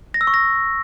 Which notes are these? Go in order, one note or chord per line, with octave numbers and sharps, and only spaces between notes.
A#6
E6
C#6
A#6